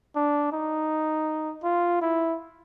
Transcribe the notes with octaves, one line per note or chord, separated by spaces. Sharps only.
D4
D#4
F4
E4